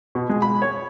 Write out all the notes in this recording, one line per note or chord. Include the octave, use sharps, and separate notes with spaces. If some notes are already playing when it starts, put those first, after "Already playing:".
B2
G#3
B5
C#5